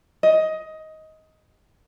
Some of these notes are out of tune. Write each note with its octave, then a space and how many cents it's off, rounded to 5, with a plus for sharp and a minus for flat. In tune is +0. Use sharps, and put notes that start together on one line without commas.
D#5 +15